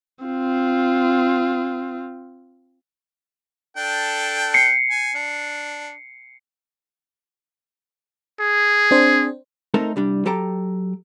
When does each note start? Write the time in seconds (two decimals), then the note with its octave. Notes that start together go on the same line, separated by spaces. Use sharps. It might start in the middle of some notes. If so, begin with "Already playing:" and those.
0.25 C4 F4
3.77 D4 A4 G5
4.54 C7 C#7
4.90 G#5
5.15 D4
8.40 G#4
8.91 C4 D4 C5
9.74 A3 C4 D#4 A4 A#4
9.96 C2 G3 D4
10.26 F#3 G4 A4 G5 A#5